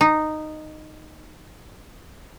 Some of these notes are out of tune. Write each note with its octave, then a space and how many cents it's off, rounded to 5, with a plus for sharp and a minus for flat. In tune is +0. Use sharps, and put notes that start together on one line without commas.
D#4 -10